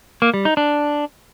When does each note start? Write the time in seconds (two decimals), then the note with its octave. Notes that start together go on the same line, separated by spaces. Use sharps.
0.22 A#3
0.34 G3
0.45 D#4
0.57 D4